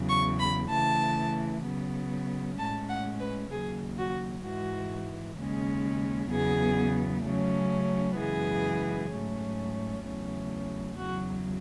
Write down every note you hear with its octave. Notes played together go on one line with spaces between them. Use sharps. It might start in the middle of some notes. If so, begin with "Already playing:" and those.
Already playing: E2 C#3 F#3
C#6
B5
C#3 E3 A3 A5
C#3 F#3 B3
A2 G#3 C#4 A5
F#5
B4
D#2 C#3 F#3 G#4
F#4
G#2 E3 G#3 F#4
D#2 C#3 G#3 C#4
E2 C#3 F#3 B3 G#4
C#3 F#3 A3 C#4
F#2 C#3 E3 G#3 B3 G#4
G#2 F#3 A3 C#4
E2 C#3 F#3 A3 C#4
E2 C#3 F#3 F#4